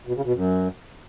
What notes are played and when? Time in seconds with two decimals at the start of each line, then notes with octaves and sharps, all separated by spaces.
0.07 B2
0.16 C#3
0.24 B2
0.33 F#2